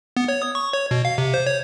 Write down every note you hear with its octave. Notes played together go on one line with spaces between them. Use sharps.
B3
C#5
D#6
C#6
C#5
B2
F5
C3
C5
C#5